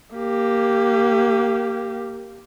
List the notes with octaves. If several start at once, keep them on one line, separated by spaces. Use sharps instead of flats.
A#3 G4